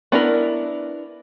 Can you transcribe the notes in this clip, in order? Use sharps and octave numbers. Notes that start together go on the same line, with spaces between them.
B3 D4 E4 A#4